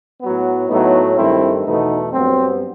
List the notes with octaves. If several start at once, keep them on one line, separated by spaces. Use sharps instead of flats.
A2 F#3 B3
A2 F#3 A3 B3 D#4
G2 D#3 A3 C4 E4
E2 B2 A3 B3 D#4
G2 F#3 B3 C4